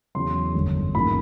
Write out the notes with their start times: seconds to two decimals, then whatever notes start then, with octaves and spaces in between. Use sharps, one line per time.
0.15 E2 C#3 F#3 C6
0.54 G1 F#2 D3
0.94 A1 G#2 F3 A#3 C#4 B5